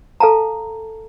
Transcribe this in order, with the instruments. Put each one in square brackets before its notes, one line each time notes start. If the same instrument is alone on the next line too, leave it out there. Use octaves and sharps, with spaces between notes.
[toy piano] A4 F5 A5 A#5